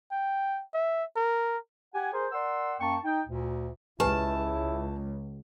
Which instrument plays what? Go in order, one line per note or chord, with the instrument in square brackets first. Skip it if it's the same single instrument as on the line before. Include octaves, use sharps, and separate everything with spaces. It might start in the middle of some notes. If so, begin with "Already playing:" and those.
[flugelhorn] G5
E5
A#4
[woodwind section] G4 F#5 G#5
G#4 A#4 C5
A#4 D5 F#5 C6 E6
F#2 A#3 G5 A5 C#6
D#4 G5
D2 A#2
[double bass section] C#2 [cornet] E4 [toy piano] G4 B4 G#5 [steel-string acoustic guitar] A5